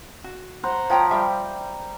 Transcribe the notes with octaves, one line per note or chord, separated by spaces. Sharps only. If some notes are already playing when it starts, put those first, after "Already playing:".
F#4
C5 F#5 A#5
F3 C#5 G5 A#5
G3 E5 F5 G5